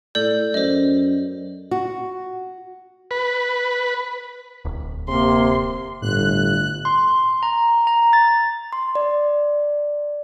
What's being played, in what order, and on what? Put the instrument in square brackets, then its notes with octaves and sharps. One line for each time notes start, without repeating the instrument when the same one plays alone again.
[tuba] A2 [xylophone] A4 D5 G6
[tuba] F#2 [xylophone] C5 D#5
[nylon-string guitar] F#4
[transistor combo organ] B4
[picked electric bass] D1
[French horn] C3 [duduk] A#3 [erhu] C6
[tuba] G1 [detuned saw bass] A2 [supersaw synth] F#6
[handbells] C6
A#5
A#5
A6
[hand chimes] C6
D5